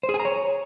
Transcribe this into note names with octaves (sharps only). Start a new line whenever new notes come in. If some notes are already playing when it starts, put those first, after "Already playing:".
C5
G#4
G#5
A#5
C#5